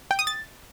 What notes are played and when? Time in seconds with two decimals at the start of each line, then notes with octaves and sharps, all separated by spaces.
0.11 G5
0.19 D#6
0.27 A6